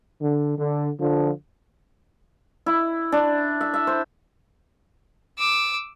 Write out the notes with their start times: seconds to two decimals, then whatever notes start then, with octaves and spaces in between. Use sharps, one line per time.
0.22 D3
0.58 D3
1.01 D3 F3
2.66 E4
3.12 D4
3.61 E5
3.74 E5
3.87 C5
5.38 D6 E6